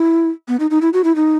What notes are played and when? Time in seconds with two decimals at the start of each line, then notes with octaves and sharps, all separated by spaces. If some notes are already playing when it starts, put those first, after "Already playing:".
Already playing: E4
0.48 B3
0.60 D#4
0.70 D#4
0.82 E4
0.93 F#4
1.04 E4
1.16 D#4